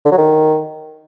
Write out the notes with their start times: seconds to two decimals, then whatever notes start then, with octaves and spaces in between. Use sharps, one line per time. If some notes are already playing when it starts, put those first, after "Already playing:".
0.05 D3
0.12 F#3
0.18 D#3